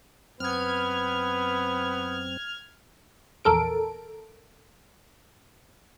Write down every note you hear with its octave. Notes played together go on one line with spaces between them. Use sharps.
F#2 B3 C4 B4 F6 G#6
A#1 E2 A4 A#4 D7